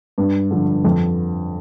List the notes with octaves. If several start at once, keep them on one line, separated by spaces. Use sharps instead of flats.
G2
D3 F3
F2